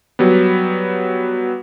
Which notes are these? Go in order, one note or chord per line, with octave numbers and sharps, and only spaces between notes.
F#3 G3 B3